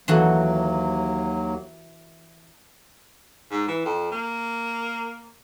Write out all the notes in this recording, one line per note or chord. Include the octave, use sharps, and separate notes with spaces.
D#2 E3 F#3 A#3 F#4 A4
G#2
E3
F2
A#3